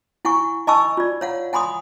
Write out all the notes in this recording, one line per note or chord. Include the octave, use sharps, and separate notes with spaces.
E4 F#5 G#5 C#6
D#5 G#5 A5 B5 C#6 E6
F4 D5
C#5 F5 F#5
F#5 G#5 B5 C6 D#6